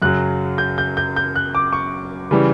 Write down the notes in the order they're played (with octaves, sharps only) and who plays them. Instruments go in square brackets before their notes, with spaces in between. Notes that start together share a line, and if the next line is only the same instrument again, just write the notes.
[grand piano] F#2 C#3 F#3 F#6
G6
G6
G6
G6
F#6
D6
C#6
C#3 E3 G3